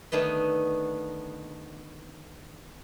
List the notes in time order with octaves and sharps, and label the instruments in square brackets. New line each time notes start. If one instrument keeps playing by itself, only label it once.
[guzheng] D3 D#3 A3 B3